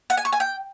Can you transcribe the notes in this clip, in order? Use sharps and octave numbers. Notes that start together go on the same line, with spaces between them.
F#5
G#5
C#6
G#5
G5